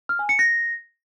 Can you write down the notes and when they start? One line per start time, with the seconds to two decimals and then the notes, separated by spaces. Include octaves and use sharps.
0.09 F6
0.19 G#5
0.29 C#7
0.39 A#6